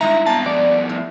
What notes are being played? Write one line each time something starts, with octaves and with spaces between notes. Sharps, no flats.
G2 G#3 D#4 E4 E5 A#5
B3 C4 A5 A#5
F3 G3 B3 D5
A2